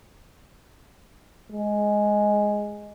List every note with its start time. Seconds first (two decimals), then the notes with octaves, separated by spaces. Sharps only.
1.52 G#3